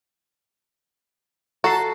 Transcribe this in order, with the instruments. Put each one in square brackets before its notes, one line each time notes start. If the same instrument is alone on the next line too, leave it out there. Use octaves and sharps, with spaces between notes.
[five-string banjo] F#4 [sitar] A4 [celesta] A#5 C7